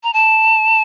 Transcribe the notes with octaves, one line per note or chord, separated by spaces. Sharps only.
A#5
A5